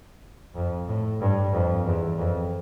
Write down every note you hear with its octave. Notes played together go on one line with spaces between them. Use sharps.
F2
A2
G2
F2
E2
F2